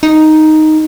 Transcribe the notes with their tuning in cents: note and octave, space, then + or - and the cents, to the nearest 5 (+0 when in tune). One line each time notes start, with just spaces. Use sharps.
D#4 +0